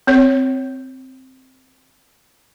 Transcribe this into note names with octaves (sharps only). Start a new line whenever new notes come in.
C4 C#5